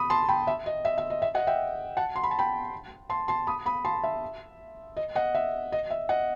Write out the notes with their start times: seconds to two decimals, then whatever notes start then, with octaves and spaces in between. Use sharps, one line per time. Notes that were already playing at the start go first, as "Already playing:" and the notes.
Already playing: B5 D#6
0.10 A5 C6
0.29 G5 B5
0.47 E5
0.66 D#5
0.85 E5
0.98 E5
1.10 D#5
1.22 E5
1.35 D#5 F#5
1.47 E5 G5
1.97 F#5 A5
2.16 C6
2.23 B5
2.31 A5
2.39 G5 B5
3.10 A5 C6
3.28 A5 C6
3.47 B5 D#6
3.66 B5 D#6
3.85 A5 C6
4.04 E5
4.97 D#5
5.15 D#5 F#5
5.35 E5
5.72 D#5
5.91 E5
6.09 D#5 F#5